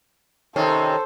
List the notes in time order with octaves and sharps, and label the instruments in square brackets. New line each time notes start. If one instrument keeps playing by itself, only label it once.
[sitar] C3 D#3 C#4 [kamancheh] A4 C5